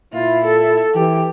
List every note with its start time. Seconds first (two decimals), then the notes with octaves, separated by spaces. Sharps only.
0.13 A#2 E4 F4
0.45 A4
0.95 E3 G4